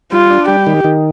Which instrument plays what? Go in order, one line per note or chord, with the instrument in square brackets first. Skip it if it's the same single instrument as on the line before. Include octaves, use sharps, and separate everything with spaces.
[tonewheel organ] G3 [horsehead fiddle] F4
[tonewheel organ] D4
[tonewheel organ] G3 [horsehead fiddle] G4
[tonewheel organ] D#3
D#3